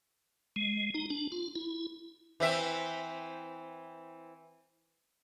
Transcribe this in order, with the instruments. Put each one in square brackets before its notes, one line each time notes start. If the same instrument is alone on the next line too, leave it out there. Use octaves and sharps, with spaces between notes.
[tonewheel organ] G#3
D#4
D4
F4
E4
[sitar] E3 C4 E5